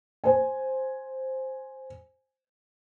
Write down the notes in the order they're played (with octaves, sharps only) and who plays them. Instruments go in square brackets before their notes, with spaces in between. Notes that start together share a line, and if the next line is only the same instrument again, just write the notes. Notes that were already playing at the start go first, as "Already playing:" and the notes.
[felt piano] C5 G#5